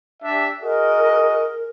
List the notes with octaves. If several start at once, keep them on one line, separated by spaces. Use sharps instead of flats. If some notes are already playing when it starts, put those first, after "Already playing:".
D4 G4 E5
F#4 G#4 A#4 D#5